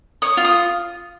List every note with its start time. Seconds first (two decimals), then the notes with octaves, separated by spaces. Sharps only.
0.22 C#5 D#6
0.37 F4
0.44 D#6